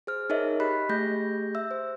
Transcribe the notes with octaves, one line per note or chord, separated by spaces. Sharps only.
G#4 C5 F6
D#4 G#4 A#4 C#5 D#5 E5
G4 D#5 B5 F#6 B6
A3 G4 G#4 G6 A#6
E5 E6
C5